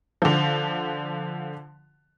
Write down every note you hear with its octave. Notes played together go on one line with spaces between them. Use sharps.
D3 F3